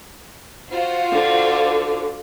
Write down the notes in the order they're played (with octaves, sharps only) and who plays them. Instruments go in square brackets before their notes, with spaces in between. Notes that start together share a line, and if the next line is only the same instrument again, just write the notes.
[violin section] F4 F#4 C5
[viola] D3